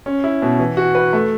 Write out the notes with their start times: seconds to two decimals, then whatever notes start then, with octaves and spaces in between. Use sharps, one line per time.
0.06 C#4
0.24 E4
0.42 B2
0.60 E3
0.77 F#4
0.95 B4
1.13 A3